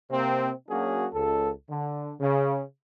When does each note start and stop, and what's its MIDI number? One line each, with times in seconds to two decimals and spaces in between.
0.10 0.50 48
0.10 0.50 58
0.10 0.50 60
0.68 1.06 54
0.68 1.06 58
0.68 1.06 61
0.68 1.06 62
0.68 1.06 66
0.68 1.06 68
1.12 1.49 37
1.12 1.49 69
1.69 2.12 50
2.20 2.61 49